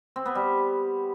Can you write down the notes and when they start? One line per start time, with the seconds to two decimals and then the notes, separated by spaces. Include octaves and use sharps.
0.16 C4
0.26 B3
0.35 G3